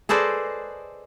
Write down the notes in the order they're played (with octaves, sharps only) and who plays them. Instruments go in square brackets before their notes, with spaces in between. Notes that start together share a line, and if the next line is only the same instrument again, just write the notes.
[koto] G#4 A4 B4 C5 D5 D#5